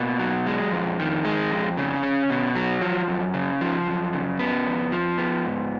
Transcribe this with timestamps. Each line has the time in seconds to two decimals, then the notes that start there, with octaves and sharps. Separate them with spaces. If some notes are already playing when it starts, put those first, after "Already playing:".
Already playing: B2 A#3
0.19 F#3
0.47 G#3
0.72 F2
0.99 D#3
1.25 G#3
1.51 F2
1.77 C#3
2.03 C#4
2.30 B2
2.55 F#3
2.82 F3
3.08 F#2
3.34 C#3
3.61 F3
3.87 F#2
4.13 C#3
4.39 B3
4.66 F2
4.92 F3
5.18 B3
5.45 G#2